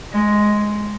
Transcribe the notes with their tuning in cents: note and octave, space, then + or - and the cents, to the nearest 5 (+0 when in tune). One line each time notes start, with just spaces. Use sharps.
G#3 +5